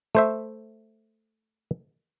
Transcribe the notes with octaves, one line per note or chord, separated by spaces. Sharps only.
A3 C5 E5